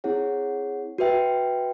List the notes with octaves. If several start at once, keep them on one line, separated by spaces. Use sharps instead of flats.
C4 E4 G#4 C#5 F#5
F#4 B4 E5 G5